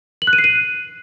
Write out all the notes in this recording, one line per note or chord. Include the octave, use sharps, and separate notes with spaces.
F#7
F#6
D#7
C7
D#7